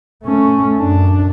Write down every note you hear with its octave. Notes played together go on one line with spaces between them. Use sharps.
A3 C#4
F#2 D4